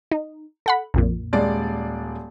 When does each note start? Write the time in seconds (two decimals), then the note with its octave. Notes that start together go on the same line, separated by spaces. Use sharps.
0.11 D#4
0.66 A4 F#5 B5
0.94 A#1 F2 A#2
1.33 D#1 G#3 D5